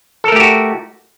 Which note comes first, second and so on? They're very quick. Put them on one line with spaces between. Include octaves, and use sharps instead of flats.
A4 A#4 A3 G4 F#4